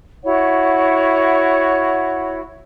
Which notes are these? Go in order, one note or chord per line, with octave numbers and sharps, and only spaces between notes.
E4 F#4 C#5 F#5